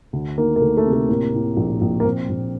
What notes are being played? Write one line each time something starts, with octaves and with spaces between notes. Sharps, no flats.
D2
D#3 A#3
A#3
D2 A3
A3
C3
A3
A2 A#3
A2
A#1
A#1
A#3
A#1 C4
A#1